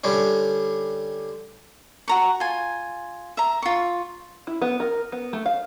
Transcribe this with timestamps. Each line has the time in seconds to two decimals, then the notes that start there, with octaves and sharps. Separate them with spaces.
0.04 D3 G3 C#4
2.08 F#4 A#5 C#6
2.40 F4 G#5
3.37 E5 A#5
3.62 F4 C#6
4.47 E4
4.62 B3
4.80 A#4
5.12 B3
5.33 A3
5.46 F5